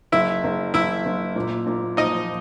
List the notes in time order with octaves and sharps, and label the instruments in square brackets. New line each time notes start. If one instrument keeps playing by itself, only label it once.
[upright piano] F#1 [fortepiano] E4 E5
[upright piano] F#1
[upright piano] F#1 [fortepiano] E4 E5
[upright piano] F#1
A#2
A#2
[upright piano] F3 [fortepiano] D#4 D#5